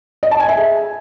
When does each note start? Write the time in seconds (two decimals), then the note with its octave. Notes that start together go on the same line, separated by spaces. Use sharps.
0.23 D#5
0.31 A5
0.40 G#5
0.49 E5
0.57 G#4